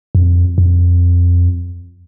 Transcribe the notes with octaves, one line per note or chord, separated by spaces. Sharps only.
F2
F2